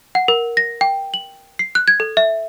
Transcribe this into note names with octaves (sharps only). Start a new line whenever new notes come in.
F#5
A#4
A#6
G5
F#7
C7
F#6
G#6
A4
E5